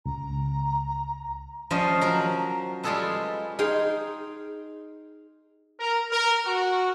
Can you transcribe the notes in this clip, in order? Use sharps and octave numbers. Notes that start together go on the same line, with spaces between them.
C#2 A#5
F3 G3 C#4 F4 C5 D#5
F3 F#3 A#4
G3 G#3 F4 G#4 A4 B4
D#4 G#4 F5 G5 C6
A#4
A#4
F#4